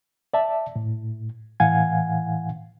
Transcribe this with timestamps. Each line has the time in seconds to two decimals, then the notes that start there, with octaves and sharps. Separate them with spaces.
0.34 D5 E5 A5
0.76 A2
1.60 A2 E3 F5 F#5 G#5 G#6